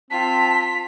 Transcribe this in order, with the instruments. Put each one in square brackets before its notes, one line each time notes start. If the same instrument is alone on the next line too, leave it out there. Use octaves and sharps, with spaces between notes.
[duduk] C4 [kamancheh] F4 [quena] A5 [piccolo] B6